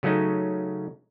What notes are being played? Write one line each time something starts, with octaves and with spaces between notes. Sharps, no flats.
C#3 F#3 A3 C#4 D#4